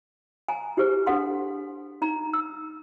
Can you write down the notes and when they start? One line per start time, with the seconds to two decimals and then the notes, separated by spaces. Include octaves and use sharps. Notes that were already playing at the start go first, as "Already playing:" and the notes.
0.48 G#5 A#5
0.77 E4 G4 G#4 B4 C5
1.07 D4 A4 F#5 C6
2.02 D#4 A#5
2.33 E6